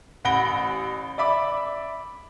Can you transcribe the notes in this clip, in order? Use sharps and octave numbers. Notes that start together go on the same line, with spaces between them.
A1 F#5 B5 A#6 D7 G7
D5 E5 B5 D6